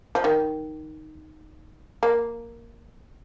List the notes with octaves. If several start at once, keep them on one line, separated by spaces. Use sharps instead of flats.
F3
D#3
A#3